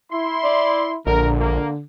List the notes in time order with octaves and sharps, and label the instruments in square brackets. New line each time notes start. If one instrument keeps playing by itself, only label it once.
[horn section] E4 C6
[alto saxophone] D5
[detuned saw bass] A#1 [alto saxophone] D3 [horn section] A#4
[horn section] A#3